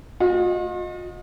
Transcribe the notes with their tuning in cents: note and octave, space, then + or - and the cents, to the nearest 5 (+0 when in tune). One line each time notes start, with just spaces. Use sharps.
F4 +45 D#5 +0